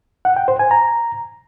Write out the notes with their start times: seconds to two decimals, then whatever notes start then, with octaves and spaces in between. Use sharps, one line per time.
0.25 F#5
0.36 G5
0.48 C5
0.59 G#5
0.71 A#5